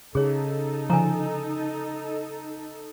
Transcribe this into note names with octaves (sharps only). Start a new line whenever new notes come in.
C#3 D#4 G#4 A4 C#5
D3 F3 G#5 A#5